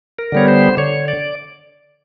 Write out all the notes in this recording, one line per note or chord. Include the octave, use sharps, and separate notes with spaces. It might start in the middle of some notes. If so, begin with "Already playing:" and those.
A#4
D3 G3 B3 C#5
C5
D3 C#5
D5